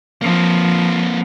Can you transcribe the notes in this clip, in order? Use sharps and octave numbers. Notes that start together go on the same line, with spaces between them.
F3 A#3 C4